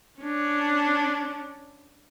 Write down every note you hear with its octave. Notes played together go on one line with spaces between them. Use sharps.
C#4 D4